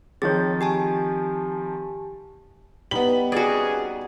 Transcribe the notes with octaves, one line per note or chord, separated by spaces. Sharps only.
D#3 F3 C4 G#4 C#5 A6
G4 G#5 A5
G3 B3 D#4 B5 F#7
F2 C#4 F#4 G#4 C5 D5